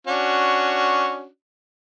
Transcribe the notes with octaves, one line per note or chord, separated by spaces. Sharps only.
C#4 D4 F#4